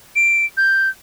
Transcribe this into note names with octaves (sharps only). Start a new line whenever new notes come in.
D7
G6